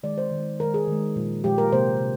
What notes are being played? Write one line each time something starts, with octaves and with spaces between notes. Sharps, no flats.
D#3 G#3 D5
C5
D#3 G#3
D#3 G#3 A#4
G#4
D#3 G#3
A#2 F3 G#3
A#2 F3 G#3 G4
A#4
C3 F3 A#3 C5
C3